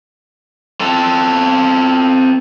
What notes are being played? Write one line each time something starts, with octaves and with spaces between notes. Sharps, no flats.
C4 A4